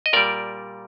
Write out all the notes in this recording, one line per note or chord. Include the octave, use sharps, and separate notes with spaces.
D#5
A#2 G3 A#4 D5